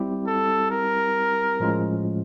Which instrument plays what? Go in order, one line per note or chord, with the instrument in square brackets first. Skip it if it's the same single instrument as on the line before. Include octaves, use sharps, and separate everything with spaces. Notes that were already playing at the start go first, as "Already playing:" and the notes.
Already playing: [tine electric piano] G3 C4 E4 G4
[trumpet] A4
A#4
[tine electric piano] A2 F3 G#3 C#4 F4